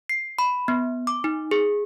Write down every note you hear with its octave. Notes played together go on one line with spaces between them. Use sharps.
C7
B5
B3
D6
D#4
G#4